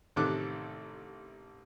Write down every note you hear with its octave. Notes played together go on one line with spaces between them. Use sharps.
A1 C3 D#3 A4 D6 F#6